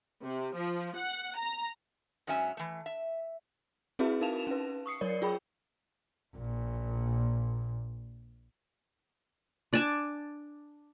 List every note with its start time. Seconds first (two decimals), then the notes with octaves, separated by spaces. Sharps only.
0.23 C3
0.54 F3
0.96 F#5
1.37 A#5
2.27 G#2 F#3 C#4 E5 G#5
2.57 E3 A3
2.86 E5
3.99 C4 E4 F#4 G#4 B4 E5
4.21 D#4 A#4 F5 A5 E7 F7
4.47 C#4 B4
4.86 C#6 D#6 C7 C#7
5.01 F#3 A#4 C#5 D5
5.22 F4 G#4 G5 B5
6.36 A#1 A#2
9.73 D4 D5 G#5 A5